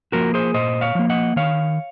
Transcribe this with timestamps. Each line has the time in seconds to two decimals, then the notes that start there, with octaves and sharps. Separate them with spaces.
0.12 F3 A#3 F#4 A#4
0.34 G#4 C5
0.54 A#2 C5 D#5
0.81 C#5 F5
0.95 F3 A#3
1.10 D#5 F#5
1.36 D#3 C#5 F5